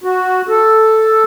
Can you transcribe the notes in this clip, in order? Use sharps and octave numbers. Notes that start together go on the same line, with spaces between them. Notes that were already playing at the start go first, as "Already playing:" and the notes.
F#4
A4